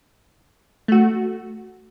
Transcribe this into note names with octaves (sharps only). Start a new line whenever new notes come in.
A3 F#4